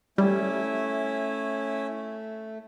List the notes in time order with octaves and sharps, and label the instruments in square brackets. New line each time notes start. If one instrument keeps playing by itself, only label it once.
[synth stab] G3 [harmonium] A3 [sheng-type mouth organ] C#4 E4